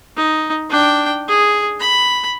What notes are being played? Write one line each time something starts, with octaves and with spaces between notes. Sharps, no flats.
D#4
D4 G5
G#4
B5